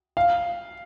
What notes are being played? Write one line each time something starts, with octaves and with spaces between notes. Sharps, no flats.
F5